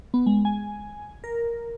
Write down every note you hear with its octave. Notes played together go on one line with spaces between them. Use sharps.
B3
G#3
G#5
A#4